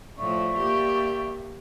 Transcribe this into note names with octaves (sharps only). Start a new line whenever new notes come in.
A2 F3 D5 E5 C#6
A#3 G4